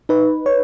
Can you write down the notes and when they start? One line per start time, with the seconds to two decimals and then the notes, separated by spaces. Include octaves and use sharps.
0.09 D#4 B4
0.46 C#5